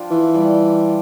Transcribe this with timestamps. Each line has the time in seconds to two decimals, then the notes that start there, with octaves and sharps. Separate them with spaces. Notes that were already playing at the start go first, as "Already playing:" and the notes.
Already playing: F3 D4 F4 G4
0.11 E3
0.34 G3